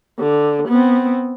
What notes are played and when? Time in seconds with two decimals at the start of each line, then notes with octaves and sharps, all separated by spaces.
0.19 D3
0.68 B3 C4